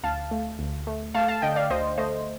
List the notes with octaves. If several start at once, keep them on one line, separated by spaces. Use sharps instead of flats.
D2 F5 A5
A3
D2
A3
A3 F5 A5
F5 A5
D3 D#5 G5
D5 F5
D2 C5 D#5
A3 C5 D#5